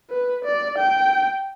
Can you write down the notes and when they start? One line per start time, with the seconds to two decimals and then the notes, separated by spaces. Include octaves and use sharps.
0.10 B4
0.44 D5
0.78 G5